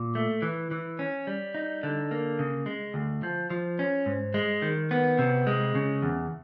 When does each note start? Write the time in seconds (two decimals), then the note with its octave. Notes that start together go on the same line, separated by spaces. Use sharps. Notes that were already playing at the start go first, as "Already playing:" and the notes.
Already playing: A#2
0.15 A3
0.42 E3
0.71 E3
0.99 C#4
1.27 G3
1.55 D#4
1.83 D3
2.11 A#3
2.39 C#3
2.66 G#3
2.94 D2
3.23 F3
3.50 F3
3.79 C#4
4.06 G#2
4.34 G#3
4.62 D#3
4.91 B3
5.19 C3
5.47 G#3
5.75 C#3
6.02 E2